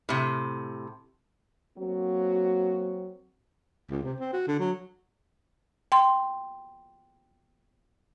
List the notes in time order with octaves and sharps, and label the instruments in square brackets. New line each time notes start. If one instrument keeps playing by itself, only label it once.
[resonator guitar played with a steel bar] A2 C3
[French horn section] F#3 A#3 C4 F#4
[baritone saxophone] C#2
C3
C4
F#4
D3
F#3
[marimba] G5 C6